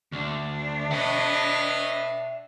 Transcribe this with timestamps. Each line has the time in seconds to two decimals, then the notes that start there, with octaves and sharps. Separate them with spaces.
0.12 D2 D4
0.91 B4 C#5 D#5 E5 G5